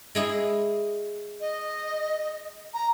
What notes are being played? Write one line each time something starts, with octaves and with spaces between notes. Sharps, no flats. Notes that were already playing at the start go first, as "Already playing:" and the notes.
G#3 E4 G#4
D#5
A#5